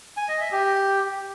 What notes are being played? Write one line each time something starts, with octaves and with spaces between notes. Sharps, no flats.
G#5
D#5
E5
G4